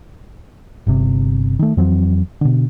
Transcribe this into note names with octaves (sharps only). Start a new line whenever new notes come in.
G1 C3
D#3 A3
F2 E3 F#3 C4
B2 D3